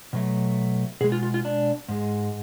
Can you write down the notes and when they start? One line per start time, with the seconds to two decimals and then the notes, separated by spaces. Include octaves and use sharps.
0.13 B2 F#3 A3
1.01 B2 G#4
1.04 G#3
1.12 F4
1.23 F4
1.34 F4
1.45 D4
1.89 G#2 G#3